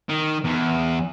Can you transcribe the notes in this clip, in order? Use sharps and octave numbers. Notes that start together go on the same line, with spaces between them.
D#3
E2